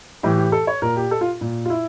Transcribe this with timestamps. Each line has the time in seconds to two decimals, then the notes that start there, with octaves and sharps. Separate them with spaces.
0.23 A2 E3 G4
0.38 G4
0.52 A4
0.67 C#5
0.82 A#2 A#4
0.96 G4
1.11 A4
1.21 F4
1.41 A#2
1.65 F4
1.70 E4